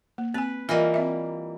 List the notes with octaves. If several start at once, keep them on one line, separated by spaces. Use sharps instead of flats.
A#3
C4 B4 G#5
E3 G3 A#3 F4 A#4 D#5
C4 D5 E5